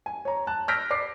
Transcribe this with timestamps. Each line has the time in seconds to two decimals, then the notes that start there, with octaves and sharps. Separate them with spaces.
0.06 G#5
0.25 C#5 A#5
0.47 A5 F#6
0.68 E6 F6 G6 A#6 B6 D7
0.91 D5 D6 C7